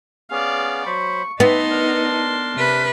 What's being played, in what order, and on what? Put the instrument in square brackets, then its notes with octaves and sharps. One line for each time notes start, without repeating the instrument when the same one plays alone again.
[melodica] B3 C#4 G#4 [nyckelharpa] D5 F5
[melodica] F#3 C5 B5 [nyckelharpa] C#6
[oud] B3 [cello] D#4 [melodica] E5 [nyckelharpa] A5 C6
[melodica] D4 A#4
[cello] C3 B4